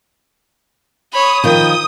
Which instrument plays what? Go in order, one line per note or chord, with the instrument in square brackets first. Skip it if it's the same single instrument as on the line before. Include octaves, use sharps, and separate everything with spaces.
[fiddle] C#5 B5 [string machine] D#6
[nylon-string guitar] D#3 F3 [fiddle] G5